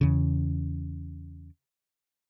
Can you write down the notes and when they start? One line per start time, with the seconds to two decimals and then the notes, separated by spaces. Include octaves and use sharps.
0.01 E2 C#3